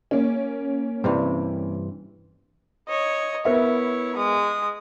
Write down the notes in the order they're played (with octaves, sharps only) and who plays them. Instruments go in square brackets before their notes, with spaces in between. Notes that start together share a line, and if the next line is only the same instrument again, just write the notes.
[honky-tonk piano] A#3 C#4
[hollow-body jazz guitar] G2 C3 E3
[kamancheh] C#5 D#5
[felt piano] B3 A#4 E5 [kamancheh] E4 C#5
[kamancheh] G#3 D#6